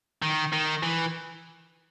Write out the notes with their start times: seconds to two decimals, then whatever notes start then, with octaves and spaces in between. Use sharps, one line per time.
0.22 D#3
0.53 D#3
0.83 E3